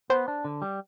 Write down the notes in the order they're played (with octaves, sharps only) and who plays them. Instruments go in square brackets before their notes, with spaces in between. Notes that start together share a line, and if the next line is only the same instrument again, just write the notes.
[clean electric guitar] B3 [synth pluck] C5
[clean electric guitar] D4
D3
G3